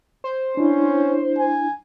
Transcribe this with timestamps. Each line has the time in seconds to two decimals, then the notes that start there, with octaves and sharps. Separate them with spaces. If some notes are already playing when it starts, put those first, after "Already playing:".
0.24 C5
0.57 C#4 D4 E4
1.39 G#5